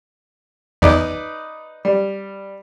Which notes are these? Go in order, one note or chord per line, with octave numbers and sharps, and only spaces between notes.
E2 D#4 B4 D5
G3